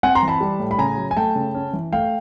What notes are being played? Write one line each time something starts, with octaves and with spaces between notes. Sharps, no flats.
C4 F#5 G#5
A#5 C6
E3
A5 B5
G3
A2
B5
C#3 G#5 A#5
F#3
G#5
A3 G5 A5
C#3
C#4
E3
A3 F5 G5